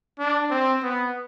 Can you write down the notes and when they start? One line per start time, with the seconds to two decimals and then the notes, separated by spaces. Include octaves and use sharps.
0.19 D4
0.51 C4
0.83 B3